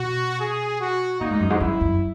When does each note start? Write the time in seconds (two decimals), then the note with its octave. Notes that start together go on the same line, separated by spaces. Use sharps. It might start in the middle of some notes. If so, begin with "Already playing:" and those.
Already playing: B2 F#4
0.40 G#4
0.80 F#4
1.20 A#2 D#4
1.31 G#2
1.40 F#2
1.50 G#2
1.60 F#2 E4
1.81 F#2